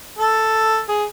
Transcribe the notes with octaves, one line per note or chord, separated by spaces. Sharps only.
A4
G#4